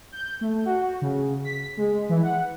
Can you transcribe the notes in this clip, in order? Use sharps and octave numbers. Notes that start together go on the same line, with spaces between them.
G6
A3
F#4
C#3
B6
G#3
E3
F#5